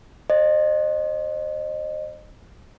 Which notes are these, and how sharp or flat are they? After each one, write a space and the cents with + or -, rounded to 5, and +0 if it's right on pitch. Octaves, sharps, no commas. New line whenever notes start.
C5 +30 D#5 -30